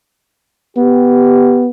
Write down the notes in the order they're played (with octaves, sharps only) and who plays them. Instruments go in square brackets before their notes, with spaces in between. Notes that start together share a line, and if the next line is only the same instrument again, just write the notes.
[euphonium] B3 [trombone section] G4